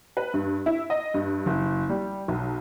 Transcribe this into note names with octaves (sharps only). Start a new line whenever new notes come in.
B4
G2
E4
D#5
G2
F#1
G3
B1